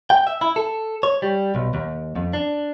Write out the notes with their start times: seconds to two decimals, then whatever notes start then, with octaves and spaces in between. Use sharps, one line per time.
0.10 G5
0.27 E5
0.41 E4
0.56 A4
1.03 C#5
1.22 G3
1.55 B1
1.74 D#2
2.16 F2
2.33 D4